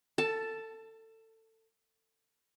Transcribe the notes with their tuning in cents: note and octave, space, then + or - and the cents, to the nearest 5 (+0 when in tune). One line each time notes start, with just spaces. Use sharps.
A4 +25 A5 +0